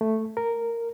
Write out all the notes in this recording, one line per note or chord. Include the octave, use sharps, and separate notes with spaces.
A3
A#4